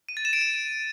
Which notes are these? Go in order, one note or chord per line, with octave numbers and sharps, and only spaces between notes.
D#7
A6
E7
D7
D#7